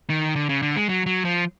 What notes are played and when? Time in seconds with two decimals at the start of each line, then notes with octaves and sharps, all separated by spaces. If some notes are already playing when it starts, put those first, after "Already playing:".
0.10 D#3
0.36 D3
0.49 C#3
0.62 D3
0.76 G#3
0.89 F#3
1.06 F#3
1.25 F3